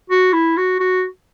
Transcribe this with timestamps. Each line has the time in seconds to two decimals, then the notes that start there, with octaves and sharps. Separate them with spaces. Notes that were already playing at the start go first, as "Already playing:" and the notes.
0.10 F#4
0.33 E4
0.57 F#4
0.80 F#4